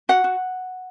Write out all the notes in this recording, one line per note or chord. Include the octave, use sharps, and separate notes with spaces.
F#4 F#5
F#4